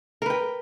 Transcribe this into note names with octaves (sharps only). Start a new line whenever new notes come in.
A#4 B4 G5